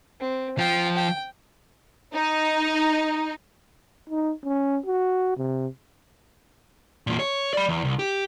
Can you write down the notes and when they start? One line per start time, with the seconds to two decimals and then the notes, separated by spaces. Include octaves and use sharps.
0.20 C4
0.58 F3 G5
0.96 G5
2.13 D#4
4.10 D#4
4.44 C#4
4.86 F#4
5.37 C3
7.07 E2 A#2
7.19 C#5
7.53 D5 B5
7.69 E2
7.84 C2
7.99 G4